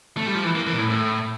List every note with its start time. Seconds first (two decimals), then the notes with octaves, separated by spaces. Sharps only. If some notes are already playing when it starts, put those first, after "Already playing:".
0.17 A3
0.26 G3
0.35 F3
0.44 E3
0.55 A#3
0.67 E3
0.74 A#2
0.78 A2
0.90 A2